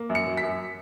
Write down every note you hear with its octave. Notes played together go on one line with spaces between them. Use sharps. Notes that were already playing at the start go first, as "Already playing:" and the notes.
Already playing: A#3
F#2
C#7
F#3
B6
F#2